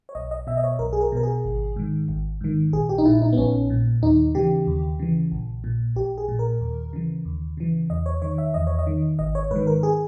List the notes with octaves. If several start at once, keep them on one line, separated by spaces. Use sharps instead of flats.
C#5
B1 D#5
D#5
B2 E5
D#5
C#5
B1 A#4
G#4
A#4
B2 A#4
G#4
G#1
G#2 D#3
G#1
G#2 D#3
A#1 G#4
G4
D#4
A#2 E4
D#4
B3
A#1 C#4
A#2
D#2 D#4
C#3 E3 G4
D#2
C#3 E3
A#1
A#2
A#1 G4
G#4
A#2
A#4
D#2
C#3 E3
D#2
C#3 E3
E2 D#5
C#5
D#3 C#5
E5
E2 D#5
C#5
D#5
D#3
G#1 D#5
C#5
G#2 D#3 B4
A#4
G#4